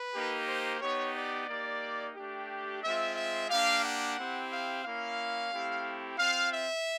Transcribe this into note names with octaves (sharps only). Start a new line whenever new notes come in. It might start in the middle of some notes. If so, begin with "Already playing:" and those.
Already playing: B4
A#3 D#4 G4
C5
B3 D#4 G4 C#5
D5
A#3 D#4 G4 D5
A3 D4 G4
G#3 C4 F4 E5
E5
A#3 D4 G4 F5
F#5
C4 E4 G4
F5
A#3 C#4 E4 F5
A3 C4 E4 G4
C4 F4 F5
E5